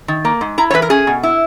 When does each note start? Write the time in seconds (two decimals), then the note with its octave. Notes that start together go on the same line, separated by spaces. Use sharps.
0.08 D#3
0.25 A#3
0.41 G#2
0.58 E4 A#5
0.70 C#5
0.74 E3 B4
0.82 A#4
0.90 C#4 G#4
1.07 B2
1.23 E4